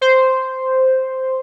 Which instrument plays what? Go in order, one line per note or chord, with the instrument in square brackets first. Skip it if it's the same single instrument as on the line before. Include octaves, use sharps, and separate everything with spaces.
[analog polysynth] C5